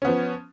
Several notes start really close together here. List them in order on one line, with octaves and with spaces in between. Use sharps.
C#4 B3 F3